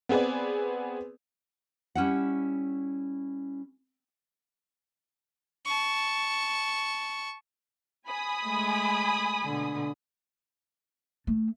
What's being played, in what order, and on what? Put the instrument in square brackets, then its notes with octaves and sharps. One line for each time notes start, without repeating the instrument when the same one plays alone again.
[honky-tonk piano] B3 C4 G#4 B4 D5
[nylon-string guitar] G3 C#4 E4 F#5
[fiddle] A5 C#6
[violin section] G#5 B5 D#6
[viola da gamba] G#3 A3
B2 D3
[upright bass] A3